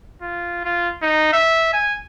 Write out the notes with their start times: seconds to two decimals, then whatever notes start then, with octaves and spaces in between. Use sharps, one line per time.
0.22 F4
0.65 F4
1.02 D#4
1.33 E5
1.73 G#5